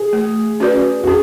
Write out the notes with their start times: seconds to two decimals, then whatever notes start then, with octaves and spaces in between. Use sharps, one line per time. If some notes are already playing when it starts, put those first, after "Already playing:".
Already playing: G#4
0.13 A3
0.60 C#4 F#4 B4 D5
1.04 F#4
1.07 C#4 G#4